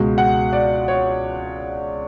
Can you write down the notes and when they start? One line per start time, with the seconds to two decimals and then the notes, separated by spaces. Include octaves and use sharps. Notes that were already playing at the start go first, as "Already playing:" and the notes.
Already playing: C#2 B2 G#3
0.18 F#5
0.53 D5
0.88 C#5